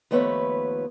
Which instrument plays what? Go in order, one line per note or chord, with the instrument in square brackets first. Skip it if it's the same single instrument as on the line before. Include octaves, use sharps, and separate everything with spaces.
[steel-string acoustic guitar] D#2 F3 A3 B3 B4 C#5